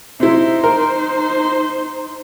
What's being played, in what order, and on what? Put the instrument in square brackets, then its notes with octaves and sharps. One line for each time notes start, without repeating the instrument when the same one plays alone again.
[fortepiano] C3 E4 [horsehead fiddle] D#4 C5
[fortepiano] A#4